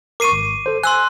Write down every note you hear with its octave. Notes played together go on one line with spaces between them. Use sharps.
A#4 C#6 D6 C7 D#7
G#1
A4 C5
G#5 C6 E6 F#6